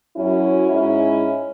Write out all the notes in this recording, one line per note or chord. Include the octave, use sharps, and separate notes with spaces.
F#2 F#3 C#4 E4
G#2 G#3 C#4 E4